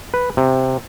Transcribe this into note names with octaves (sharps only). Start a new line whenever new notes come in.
B4
C3